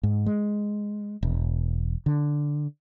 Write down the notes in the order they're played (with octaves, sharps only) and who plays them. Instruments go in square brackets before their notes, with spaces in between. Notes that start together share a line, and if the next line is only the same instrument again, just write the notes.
[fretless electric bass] G#2
G#3
E1
D3